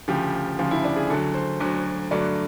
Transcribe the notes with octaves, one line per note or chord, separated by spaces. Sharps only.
D2 C#3 F3 G4
D2 C#3 F3 F4
E4
D4
G#4
D2 D3 F#3 A4
C5
D2 D3 F#3
G2 D3 F#3 A3 D5